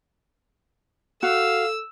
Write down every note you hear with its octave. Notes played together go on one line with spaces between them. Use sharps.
F#4 A4 F5 E6